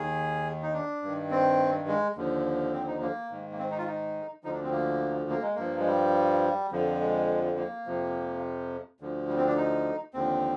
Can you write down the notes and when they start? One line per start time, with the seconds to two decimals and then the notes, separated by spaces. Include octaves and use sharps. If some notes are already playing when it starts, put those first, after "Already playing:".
Already playing: D#2 D#3 G#4
0.62 D#4
0.73 D4
1.03 G2 D#3
1.31 C4
1.88 G#3
2.16 D#2 D3 F3
2.73 C4
2.87 D#4
3.02 A#3
3.31 G#2 D#3
3.51 A#3
3.59 C4
3.71 D#4
3.78 F4
3.87 D#4
4.44 D2 D3 F3 D#4
4.54 D4
4.63 C4
4.72 A#3
5.30 A#3
5.42 G#3
5.55 G2 F3 A#3
5.80 G#3
5.87 G3
6.72 F2 D3 F3
7.01 G#3
7.58 A#3
7.86 F2 C3 F3
9.00 D2 D3 F3
9.29 G3
9.37 C4
9.47 D4
9.57 D#4
10.14 D#2 D3 F3 C4